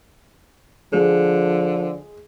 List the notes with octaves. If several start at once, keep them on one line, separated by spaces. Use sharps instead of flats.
D3 F3 G#3